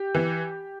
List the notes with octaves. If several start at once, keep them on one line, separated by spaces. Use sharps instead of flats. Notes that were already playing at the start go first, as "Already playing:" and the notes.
Already playing: G4
E3